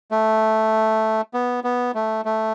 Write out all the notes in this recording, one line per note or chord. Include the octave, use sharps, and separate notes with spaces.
A3
B3
B3
A3
A3